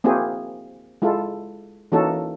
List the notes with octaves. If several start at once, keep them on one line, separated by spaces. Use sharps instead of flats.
A#3 C4 E4 F#4 G#4
G#3 E4 F4 A4
E3 A#3 C#4 D#4 F#4 A4